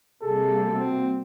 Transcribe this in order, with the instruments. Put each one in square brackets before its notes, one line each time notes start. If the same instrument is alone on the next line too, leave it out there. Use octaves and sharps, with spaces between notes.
[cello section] C3 G3 A#3 [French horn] G#4 [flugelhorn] A4
[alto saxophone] C4 [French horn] F#4